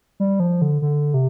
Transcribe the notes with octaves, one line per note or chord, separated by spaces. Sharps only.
G3
F3
D3
D3
C3